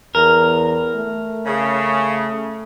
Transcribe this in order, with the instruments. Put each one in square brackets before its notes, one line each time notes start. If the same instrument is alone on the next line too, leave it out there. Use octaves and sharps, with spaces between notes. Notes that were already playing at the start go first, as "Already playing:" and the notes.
[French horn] E2 [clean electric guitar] A#4
[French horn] A3
[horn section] C#3